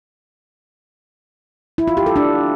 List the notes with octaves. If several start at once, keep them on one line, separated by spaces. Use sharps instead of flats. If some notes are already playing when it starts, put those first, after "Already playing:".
E4
F4
G4
A4
D4